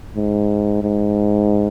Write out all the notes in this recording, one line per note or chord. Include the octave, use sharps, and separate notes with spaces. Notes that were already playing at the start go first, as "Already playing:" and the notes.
G#2
G#2